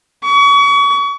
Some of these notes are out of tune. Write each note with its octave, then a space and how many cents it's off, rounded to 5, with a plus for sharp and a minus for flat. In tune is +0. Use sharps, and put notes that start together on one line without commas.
C#6 +35